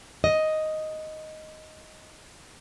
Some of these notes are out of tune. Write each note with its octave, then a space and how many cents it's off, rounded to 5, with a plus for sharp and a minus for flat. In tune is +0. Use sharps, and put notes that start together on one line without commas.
D#5 +5